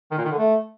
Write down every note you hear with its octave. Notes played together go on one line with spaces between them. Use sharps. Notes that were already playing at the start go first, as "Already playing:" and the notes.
D#3
A#2
D#3
D3
A3